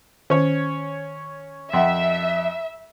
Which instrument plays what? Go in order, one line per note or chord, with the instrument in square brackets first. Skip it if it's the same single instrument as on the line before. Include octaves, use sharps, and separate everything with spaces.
[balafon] D#3 [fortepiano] C#4 C#5
[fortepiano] F2 [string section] E5 [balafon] F#5 G5 C6